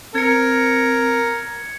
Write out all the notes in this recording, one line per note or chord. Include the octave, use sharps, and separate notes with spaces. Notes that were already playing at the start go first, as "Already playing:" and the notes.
C4 A#4 G#6 C#7